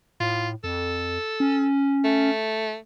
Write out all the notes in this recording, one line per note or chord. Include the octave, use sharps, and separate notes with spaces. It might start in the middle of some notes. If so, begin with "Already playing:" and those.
A2 F4
F2 A4
C#4
A3